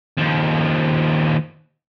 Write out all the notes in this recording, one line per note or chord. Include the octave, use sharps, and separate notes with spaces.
D#2 F3